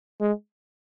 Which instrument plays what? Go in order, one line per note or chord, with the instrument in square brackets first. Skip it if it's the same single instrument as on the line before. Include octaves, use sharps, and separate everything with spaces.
[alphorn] G#3